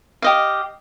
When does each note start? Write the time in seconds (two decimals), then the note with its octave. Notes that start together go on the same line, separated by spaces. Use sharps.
0.22 G4 D#5 F5